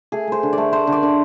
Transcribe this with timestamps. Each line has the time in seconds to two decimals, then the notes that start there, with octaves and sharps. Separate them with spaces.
0.12 A3 G#4
0.27 A3 C5
0.43 D3
0.53 A3 D5
0.72 A3 C5
0.87 D3
0.92 D5
1.03 D3